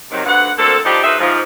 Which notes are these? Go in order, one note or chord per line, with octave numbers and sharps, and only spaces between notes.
C3 D#3 F#3
D2 G2 F#5
D2 A#3 C4 A4
F3 G3 D4 D#4 G4
F#3 D#4 F4 G#4 B4 E5
G#2 F3